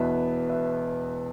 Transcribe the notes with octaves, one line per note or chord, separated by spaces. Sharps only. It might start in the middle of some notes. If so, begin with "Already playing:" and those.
Already playing: E1 E2 B2 B4 E5
B4 E5